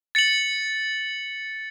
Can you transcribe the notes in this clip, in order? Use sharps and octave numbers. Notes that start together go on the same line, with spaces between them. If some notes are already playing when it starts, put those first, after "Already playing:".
A6 C#7 F#7